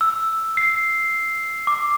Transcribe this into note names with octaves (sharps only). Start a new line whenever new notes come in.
E6
C7
D6